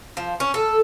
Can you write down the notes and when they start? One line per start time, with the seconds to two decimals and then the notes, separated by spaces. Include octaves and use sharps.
0.17 F3
0.40 C#4
0.54 A4